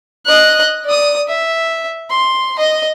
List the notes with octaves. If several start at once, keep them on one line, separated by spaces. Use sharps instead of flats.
D#5 F#6
D5 D#6
E5
C6
D#5